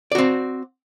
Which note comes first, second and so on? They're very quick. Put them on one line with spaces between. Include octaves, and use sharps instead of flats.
D5 F#4 C4